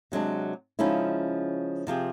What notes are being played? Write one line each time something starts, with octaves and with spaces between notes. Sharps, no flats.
C3 F#3 G#3 D4
C#3 F3 G#3 C#4 D#4 E4
C3 F3 G4 G#4